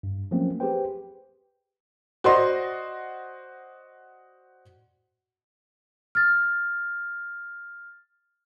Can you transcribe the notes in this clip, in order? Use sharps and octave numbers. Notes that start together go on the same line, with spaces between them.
G2
F3 F#3 A3 A#3 C4 C#4
G4 G#4 B4 C5 G5
F#4 C5 D5 D#5 C6
F6 A6